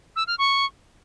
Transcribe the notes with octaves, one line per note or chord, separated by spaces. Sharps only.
E6
F6
C#6